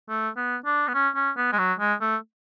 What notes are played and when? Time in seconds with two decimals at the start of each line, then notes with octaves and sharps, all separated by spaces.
0.09 A3
0.37 B3
0.66 D4
0.88 B3
0.94 C#4
1.16 C#4
1.37 B3
1.52 G#3
1.58 F#3
1.79 G#3
2.01 A3